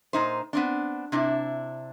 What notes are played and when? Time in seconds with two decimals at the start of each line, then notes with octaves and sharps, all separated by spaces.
0.13 A#2 D#4 C5
0.53 B3 C4 D4
1.12 C3 D4 E4